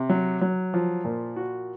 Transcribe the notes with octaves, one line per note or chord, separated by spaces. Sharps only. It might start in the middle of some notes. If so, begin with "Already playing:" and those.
Already playing: C3
F#3
F#3
F3
A#2
F#4